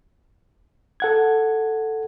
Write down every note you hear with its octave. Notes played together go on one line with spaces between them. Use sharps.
A4 F#5 G#6